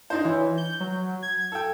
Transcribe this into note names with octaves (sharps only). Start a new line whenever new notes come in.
D4 D#4 C5
E3 C#5
G6
F#3
G#6
A4 G5